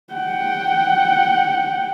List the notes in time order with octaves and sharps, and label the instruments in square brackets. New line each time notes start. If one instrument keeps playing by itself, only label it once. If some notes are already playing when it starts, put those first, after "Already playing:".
[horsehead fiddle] F#5 G5